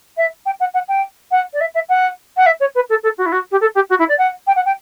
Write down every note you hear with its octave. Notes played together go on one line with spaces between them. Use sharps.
E5
G5
F#5
F#5
G5
F#5
D5
E5
E5
F#5
F#5
E5
C#5
B4
A4
A4
F#4
E4
F#4
G4
A4
G4
F#4
E4
D5
F#5
G5
F#5
G5